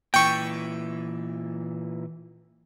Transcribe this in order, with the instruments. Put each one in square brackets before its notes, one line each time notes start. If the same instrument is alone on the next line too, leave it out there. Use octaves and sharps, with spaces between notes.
[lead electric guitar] A#2 E3 [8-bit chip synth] G5 C#6